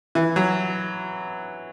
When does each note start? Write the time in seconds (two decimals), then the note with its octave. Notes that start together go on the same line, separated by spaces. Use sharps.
0.15 E3
0.36 F#3